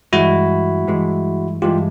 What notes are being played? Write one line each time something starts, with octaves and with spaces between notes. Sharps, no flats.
G2 E3 G#3 E4 F#4
G2 E3 G#3
G2 E3 G#3 F4 G4